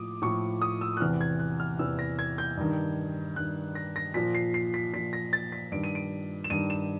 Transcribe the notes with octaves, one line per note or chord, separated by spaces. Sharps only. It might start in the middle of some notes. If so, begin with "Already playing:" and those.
Already playing: A2 F3 D6 D#6
A2 F3 C#6
D#6
E6
F#6
E2 C3 E3 F6
G#6
F#6
F6
E2 C3 E3 E6
A#6
G#6
G6
G2 D#3
G2 D#3 F#6
A#6
A#6
A#2 F3 B6
C7
C7
B6
A#2 F3 B6
A#6
A6
B6
G2 D#3 D7
D#7
D7
E7
G2 D#3 D#7
E7